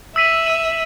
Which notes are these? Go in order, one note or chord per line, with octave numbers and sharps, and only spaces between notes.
E5 E6 B6 D#7 F#7
E6 B6 D#7 F#7